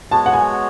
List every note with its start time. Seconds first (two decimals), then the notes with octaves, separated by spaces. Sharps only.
0.11 G#3 B3 F#4 C#5 A5
0.26 F#5
0.33 G#5